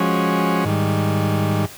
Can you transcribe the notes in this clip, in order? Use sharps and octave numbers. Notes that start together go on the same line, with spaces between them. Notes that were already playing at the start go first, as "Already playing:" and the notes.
Already playing: F3 G#3 C#4 F#4
G#2 D#3 G3